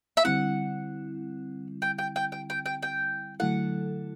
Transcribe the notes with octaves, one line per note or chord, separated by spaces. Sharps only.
E5
D3 G3 C4 E4 F#5
G5
G5
G5
G5
G5
G5
G5
D3 F#3 A3 E4 A4 F#5